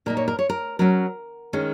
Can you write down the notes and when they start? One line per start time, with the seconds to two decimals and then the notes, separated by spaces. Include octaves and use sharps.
0.06 A#2 A#3 D#4 A#4
0.17 C#5
0.28 A#4
0.39 C#5
0.49 A#4
0.79 F#3 C#4 A#4
1.53 D#3 G#3 C#4